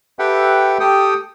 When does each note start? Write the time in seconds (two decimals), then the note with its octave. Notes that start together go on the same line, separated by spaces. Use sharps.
0.19 G4 A4 B4 E5 F#5 G5
0.80 G4 A4 G5 D#6